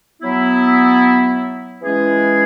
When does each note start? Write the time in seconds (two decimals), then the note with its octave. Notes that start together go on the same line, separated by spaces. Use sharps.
0.21 F#3 B3 E4
1.83 E3 G#3 C#4 E4 G#4